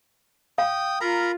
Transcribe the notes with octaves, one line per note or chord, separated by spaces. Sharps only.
F5 G5 D#6
F4 A#4 A#5 B5